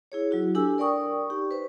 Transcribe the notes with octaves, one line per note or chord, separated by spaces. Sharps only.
E4 G#4 C#5
F#3 E4 F#4
D4 G4 A4 G#5 E6
A#4 D5 G5 C#6 D#6
D#4 G4
B4 C5